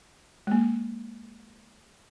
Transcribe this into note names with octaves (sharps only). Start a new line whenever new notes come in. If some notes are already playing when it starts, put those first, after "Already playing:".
G#3 A#3